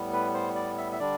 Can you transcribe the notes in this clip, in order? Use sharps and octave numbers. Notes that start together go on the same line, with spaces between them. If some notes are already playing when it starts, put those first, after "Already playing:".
Already playing: A2 G3 B3
B4
C5
D5
E5
E5
D3 G3 D4 D5